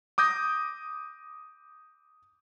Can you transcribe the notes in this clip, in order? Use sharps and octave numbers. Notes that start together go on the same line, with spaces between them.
D6 D#6 G6 A#6